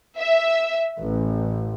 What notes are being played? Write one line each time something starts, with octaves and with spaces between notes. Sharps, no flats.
E5
A1